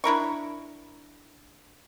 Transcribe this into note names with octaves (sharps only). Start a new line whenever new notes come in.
D4 E4 A#4 C#6